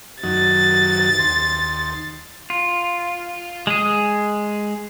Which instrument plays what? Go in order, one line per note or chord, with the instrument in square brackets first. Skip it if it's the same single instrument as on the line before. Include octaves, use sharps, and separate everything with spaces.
[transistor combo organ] F#2 D#3 F#3 [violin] A6
[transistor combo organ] D#2 C6
[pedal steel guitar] F4
G#3 G#4